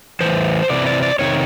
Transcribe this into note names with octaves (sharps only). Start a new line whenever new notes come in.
A2 E3 C5
C3 E3 D5
D5
D5
C3 D#3 C#5